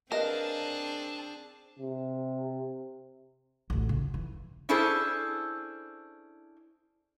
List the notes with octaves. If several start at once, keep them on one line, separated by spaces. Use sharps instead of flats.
C4 D4 G#4 A#4 B4 D#5 F5 A5
C3
A1 D2
C#3
E3
C#4 D4 E4 G#4 A4 C5